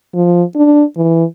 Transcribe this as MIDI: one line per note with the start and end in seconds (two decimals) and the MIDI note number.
0.14 0.43 53
0.56 0.84 62
0.97 1.24 52